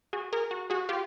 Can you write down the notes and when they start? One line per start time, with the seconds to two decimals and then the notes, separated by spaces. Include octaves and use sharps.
0.13 F#4 G#4
0.33 G#4 A#4
0.51 F#4
0.70 F#4 G#4
0.89 F4 G4